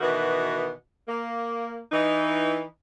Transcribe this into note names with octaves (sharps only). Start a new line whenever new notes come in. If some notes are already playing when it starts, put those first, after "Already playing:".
B2 D#3 E3 B3 F#4
A#3
E3 D#4